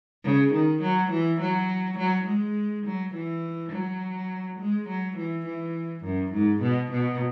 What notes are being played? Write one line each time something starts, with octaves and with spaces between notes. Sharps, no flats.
C#3
D#3
F#3
E3
F#3
F#3
G#3
F#3
E3
F#3
G#3
F#3
E3
E3
F#2
G#2
B2
B2